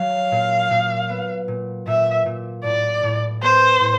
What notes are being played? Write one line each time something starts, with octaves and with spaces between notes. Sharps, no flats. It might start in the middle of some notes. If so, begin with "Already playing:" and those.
Already playing: F#3 F5
A#2
A#2
B3
A#2
A#2 E5
A#2
A2 D5
A2
B3 C5
A2